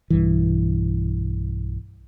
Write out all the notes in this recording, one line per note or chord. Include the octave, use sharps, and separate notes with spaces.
B1 G2 E3